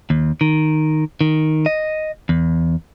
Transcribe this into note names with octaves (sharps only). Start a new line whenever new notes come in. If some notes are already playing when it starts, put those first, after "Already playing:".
D#2
D#3
D#3
D#5
E2